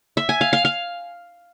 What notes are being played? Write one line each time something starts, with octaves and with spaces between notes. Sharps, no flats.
E5
G#5
F5
F5
F5